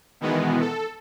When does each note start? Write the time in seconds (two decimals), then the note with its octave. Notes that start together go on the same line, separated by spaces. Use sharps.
0.21 B2 D#3 E3 G#3 B3
0.61 A4